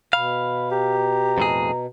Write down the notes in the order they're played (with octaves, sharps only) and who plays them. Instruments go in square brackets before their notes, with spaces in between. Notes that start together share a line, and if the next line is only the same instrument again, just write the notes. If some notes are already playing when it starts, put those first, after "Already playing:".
[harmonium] B2 [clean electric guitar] F5 [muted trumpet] B5
[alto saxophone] G4 [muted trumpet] A#5
[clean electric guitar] F2 A2 G#4